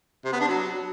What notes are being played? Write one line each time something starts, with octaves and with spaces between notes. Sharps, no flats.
C3
B3
D4
F#3